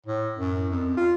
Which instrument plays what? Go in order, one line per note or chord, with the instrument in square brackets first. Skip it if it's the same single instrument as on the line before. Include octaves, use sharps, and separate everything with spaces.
[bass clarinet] A2
F#2
F2
F4